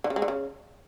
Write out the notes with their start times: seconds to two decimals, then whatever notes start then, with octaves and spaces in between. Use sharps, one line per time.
0.04 D3
0.10 C#3
0.16 G#3
0.22 D3
0.28 C#3